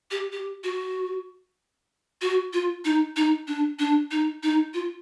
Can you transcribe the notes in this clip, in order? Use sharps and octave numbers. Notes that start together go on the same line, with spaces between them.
G4
G4
F#4
F#4
F4
D#4
D#4
D4
D4
D#4
D#4
F4